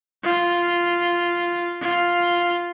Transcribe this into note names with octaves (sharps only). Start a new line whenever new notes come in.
F4
F4